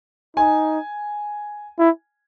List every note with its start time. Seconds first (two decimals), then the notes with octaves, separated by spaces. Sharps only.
0.36 D#4 G#5
1.79 E4